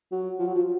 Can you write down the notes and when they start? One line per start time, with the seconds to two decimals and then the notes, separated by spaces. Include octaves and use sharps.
0.12 F#3
0.39 F3
0.47 F#3
0.54 F3